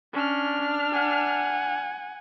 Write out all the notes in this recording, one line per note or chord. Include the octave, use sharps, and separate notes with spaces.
C#4 D4 F6
F#5 G#5